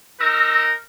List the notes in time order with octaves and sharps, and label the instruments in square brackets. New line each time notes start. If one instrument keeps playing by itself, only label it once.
[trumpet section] D#4 A#4 [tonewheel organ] E6 A#6